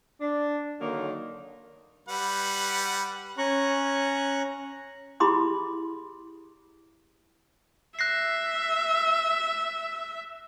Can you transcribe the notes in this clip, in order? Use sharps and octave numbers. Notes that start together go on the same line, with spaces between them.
D4
D3 D#3 F#3 A#3
G3 B4 F#5
C#4 A#5 C#6 F#6
E4 G4 G#4 B5 C6 D#6
E5 F#6 A#6 C7